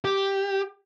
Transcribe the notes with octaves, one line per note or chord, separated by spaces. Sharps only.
G4